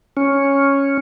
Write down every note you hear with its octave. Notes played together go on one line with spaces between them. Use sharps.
C#4